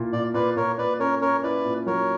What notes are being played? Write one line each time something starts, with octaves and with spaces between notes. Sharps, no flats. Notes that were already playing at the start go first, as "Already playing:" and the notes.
Already playing: A#2 E4
A#2 D5
A#2 B4 D5
A#2 A#4 C#5
A#2 B4 D5
C#4 A#4 C#5
C#4 A#4 C#5
E4 B4 D5
A#2
F#3 A#4 C#5